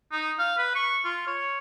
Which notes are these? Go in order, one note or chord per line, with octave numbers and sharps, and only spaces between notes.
D#4
F5
B4
C#6
F4
C#5